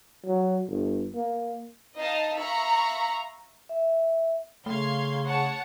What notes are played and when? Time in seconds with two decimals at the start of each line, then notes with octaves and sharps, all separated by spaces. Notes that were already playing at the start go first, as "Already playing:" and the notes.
0.25 F#3
0.67 G1
1.15 A#3
1.98 D#4 D#5 F5 A5
2.38 E5 F5 A#5 B5 C#6
3.69 E5
4.66 C#3 A3 F5 C6 G#6
5.26 C#5 F#5 A5